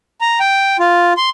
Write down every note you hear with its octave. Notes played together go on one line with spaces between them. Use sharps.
A#5
G5
F4
C6